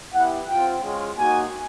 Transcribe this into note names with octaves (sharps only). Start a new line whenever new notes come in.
B3 E4 G4 F#5
C4 F4 G5
G#3 C#4 F4
A#3 D#4 F#4 G#5